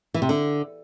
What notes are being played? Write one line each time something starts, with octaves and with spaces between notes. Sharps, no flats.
E3
C3
D3